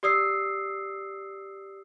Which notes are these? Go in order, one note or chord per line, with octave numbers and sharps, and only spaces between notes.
G4 D5 D#6 E6 C7